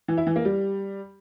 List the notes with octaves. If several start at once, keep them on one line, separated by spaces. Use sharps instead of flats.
E3
E4
E3
A#3
G3